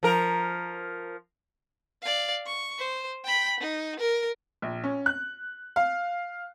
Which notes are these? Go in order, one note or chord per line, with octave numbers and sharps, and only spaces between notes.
F3 A#4
D5 F5
C#6
C5
G5 B5
D#4
A#4
A#1
C#4
F#6
F5